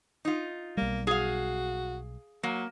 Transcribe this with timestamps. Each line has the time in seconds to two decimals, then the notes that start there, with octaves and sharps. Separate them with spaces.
0.25 D#4 F4
0.77 B1 G3 A#3
1.07 F#4 G#4 F5
2.43 F#3 A#3